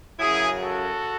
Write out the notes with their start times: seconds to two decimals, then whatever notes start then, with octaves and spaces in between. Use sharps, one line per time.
0.19 F#2 C#3 F#3 E4 G#4
0.62 F#4 A4